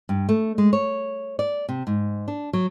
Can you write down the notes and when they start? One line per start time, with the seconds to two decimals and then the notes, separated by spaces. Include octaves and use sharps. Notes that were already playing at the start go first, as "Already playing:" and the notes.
0.09 G2
0.29 A3
0.58 G#3
0.73 C#5
1.39 D5
1.69 C3
1.87 G#2
2.28 D4
2.53 F#3